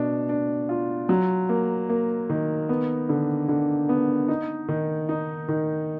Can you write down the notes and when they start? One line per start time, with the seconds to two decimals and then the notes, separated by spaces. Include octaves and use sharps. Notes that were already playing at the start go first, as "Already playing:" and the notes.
Already playing: B2 D4
0.29 D4
0.69 F4
1.09 F#3
1.49 A#3
1.89 A#3
2.30 D#3
2.69 B3
3.09 D3
3.48 D3
3.89 B3
4.28 D#4
4.69 D#3
5.09 D#4
5.48 D#3